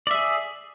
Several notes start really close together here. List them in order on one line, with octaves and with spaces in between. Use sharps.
D5 E5 G#4